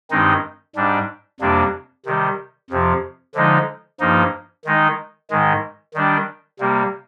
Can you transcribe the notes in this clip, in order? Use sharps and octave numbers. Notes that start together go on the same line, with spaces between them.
G2 D#3 G#3 C4 D#4
G#2 G3 D4
F2 C3 G3 A#3 D4
C3 D#3 G3
F2 C3 F3
D3 F3 G#3 D#4
G2 F3 A#3 D#4
D#3 G#3 D#4
G#2 D#3 G#3
D#3 G3 D4
C3 G3 A#3